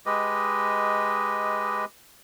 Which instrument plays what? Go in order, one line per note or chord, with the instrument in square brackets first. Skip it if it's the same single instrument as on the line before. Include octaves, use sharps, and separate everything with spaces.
[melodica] G#3 G4 B4 D#5